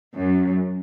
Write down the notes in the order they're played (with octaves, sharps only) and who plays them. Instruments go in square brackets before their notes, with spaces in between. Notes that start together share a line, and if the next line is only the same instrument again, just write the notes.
[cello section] F#2